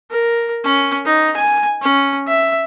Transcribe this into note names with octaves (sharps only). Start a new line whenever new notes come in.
A#4
C#4
D#4
G#5
C#4
E5